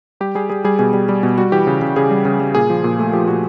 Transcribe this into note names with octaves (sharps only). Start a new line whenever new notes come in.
G3 G4
G3 G#4
G3 G#4
G3 G#4
B2 G#4
G3
G3
B2
G3 F#4
E3 G4
C#3
C#3
C#3 G#4
G3
C#3
G3
A#2 G#4
F3
A#2
A3
F3 G4
A#2 F#4